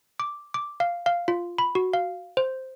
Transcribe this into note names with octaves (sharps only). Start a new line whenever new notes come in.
D6
D6
F5
F5
F4
B5
F#4
F5
C5